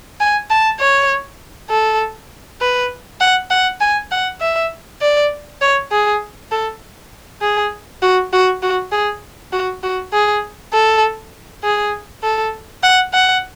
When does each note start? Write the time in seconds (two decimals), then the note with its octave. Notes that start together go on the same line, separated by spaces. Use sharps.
0.20 G#5
0.50 A5
0.80 C#5
1.70 A4
2.61 B4
3.21 F#5
3.50 F#5
3.81 G#5
4.11 F#5
4.41 E5
5.02 D5
5.62 C#5
5.92 G#4
6.52 A4
7.42 G#4
8.02 F#4
8.33 F#4
8.63 F#4
8.92 G#4
9.53 F#4
9.83 F#4
10.13 G#4
10.73 A4
11.64 G#4
12.23 A4
12.83 F#5
13.14 F#5